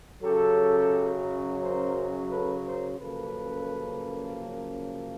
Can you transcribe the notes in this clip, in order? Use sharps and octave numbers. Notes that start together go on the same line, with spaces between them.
F#2 C#3 F#3 G4 A4
A#4 C5
A4 B4
A#4 C5
F#2 C#3 F3 A#3 A4 B4